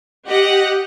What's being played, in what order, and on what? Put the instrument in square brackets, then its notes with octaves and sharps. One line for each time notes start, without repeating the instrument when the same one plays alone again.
[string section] G4 D#5 F#5